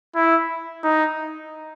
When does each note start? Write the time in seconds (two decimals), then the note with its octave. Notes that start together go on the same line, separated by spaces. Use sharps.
0.15 E4
0.84 D#4